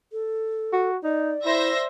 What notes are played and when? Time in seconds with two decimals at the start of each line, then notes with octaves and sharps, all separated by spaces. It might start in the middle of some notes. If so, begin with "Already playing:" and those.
0.12 A4
0.73 F#4
1.04 D#4 D5
1.45 E4 C5 E5 A#6